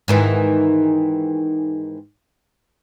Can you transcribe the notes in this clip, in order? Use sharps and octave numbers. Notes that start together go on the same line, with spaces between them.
G#2 D#3 E3